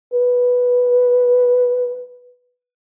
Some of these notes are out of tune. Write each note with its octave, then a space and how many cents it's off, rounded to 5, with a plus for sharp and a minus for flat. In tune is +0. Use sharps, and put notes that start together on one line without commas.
B4 -5